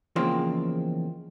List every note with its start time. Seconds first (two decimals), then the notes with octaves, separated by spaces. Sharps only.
0.16 E2 C#3 F3 G#3 A#3 C4